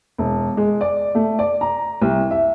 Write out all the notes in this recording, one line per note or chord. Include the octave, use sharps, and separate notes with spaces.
E1
G#3
D5
A3
D5
A#5
C2
E5